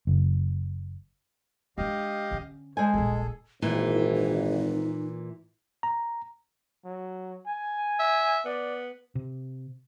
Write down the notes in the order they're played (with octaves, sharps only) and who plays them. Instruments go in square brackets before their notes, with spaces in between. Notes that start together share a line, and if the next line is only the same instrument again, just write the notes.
[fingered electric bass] F#1
[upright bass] G#3 D4 [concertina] G4 D#5 F5
[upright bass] D3 C#4
[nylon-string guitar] G#3 G#5 [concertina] A4 C5
[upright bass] D#1 A#1 [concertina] G#4 A4
[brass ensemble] G#1 [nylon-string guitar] A#2 E3 [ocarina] E4
[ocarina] D#4
[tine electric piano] A#5
[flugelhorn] F#3
G#5
[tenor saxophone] E5
[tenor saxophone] B3 [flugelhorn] D5
[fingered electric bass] C3